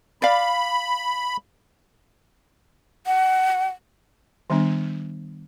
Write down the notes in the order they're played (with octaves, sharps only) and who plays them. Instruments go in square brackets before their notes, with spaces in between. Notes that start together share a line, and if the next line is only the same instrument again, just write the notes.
[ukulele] D5 F5 [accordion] B5
[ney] F#5
[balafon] D#3 G3 B3 D4